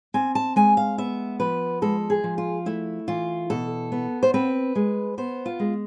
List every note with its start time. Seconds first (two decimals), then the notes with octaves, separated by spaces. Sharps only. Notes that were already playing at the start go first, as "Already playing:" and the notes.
0.14 C4 G#5
0.35 A5
0.56 G#3 G#5
0.77 F5
0.98 B3 E5
1.40 F3 B4
1.82 G#3 A4
2.10 G#4
2.24 F3
2.38 F4
2.66 A3 E4
3.08 E3 F4
3.50 B2 A4
3.92 B3
4.23 C5
4.34 C4 B4
4.75 G#3
5.18 B3 C5
5.46 F4
5.60 G#3